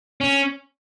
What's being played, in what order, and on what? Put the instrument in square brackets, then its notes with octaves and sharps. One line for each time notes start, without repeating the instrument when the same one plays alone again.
[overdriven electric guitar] C#4